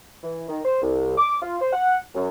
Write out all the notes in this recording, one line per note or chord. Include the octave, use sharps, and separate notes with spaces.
E3
D#3
C5
C2
D6
F4
C5
F#5
F#2